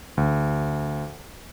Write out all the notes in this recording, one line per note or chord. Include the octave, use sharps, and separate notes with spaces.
D2